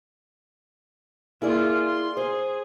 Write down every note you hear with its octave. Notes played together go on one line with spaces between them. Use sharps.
A#3 E4 F4 G#4 D5
C6
G#4 C5